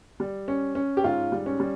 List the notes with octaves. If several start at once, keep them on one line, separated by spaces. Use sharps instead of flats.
G3
C#4
C#4
G4
G#2 F4
G3
C#4
G3